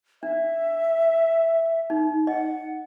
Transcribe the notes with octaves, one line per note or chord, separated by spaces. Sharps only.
D4 E5
D#4
D#5 F#5